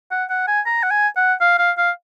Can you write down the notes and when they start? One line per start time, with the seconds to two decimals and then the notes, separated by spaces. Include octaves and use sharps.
0.11 F#5
0.30 F#5
0.47 G#5
0.66 A#5
0.83 F#5
0.91 G#5
1.16 F#5
1.41 F5
1.58 F5
1.78 F5